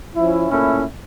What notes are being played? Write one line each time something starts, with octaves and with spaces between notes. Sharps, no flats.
F3 C#4 E4
A#2 A3 C#4 E4